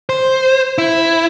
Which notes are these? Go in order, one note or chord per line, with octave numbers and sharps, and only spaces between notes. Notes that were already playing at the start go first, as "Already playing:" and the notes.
C5
E4